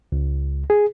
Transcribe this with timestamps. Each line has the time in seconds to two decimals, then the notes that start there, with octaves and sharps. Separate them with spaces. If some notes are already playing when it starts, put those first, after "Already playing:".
0.12 C#2
0.70 G#4